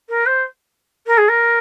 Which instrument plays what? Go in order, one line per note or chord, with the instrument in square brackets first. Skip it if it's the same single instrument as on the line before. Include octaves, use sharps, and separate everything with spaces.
[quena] A#4
C5
A#4
G#4
A#4